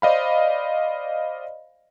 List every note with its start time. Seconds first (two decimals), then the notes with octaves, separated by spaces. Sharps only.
0.02 C5 D5 D#5 F5 B5